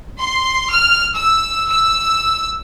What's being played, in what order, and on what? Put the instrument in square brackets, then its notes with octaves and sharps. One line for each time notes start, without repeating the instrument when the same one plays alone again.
[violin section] C6
F6
E6
E6